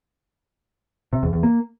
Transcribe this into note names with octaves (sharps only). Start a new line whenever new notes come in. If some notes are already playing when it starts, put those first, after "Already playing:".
C3
E2
E2
A#3